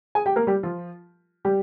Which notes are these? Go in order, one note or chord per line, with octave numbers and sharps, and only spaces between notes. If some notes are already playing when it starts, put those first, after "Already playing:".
G#4 G#5
G4 G5
A#3 A#4
G3 G4
F3 F4
G3 G4